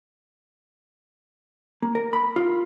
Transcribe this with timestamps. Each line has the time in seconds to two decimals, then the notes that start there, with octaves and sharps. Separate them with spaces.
1.82 A#3
1.95 A#4
2.13 B5
2.36 F4